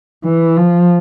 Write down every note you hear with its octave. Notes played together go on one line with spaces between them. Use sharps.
E3
F3